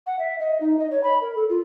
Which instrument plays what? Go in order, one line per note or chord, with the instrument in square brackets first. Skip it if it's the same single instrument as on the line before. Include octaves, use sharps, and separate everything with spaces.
[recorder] F#5
E5
D#5
D#4
D#5
C#5
B5
A#4
A4
F4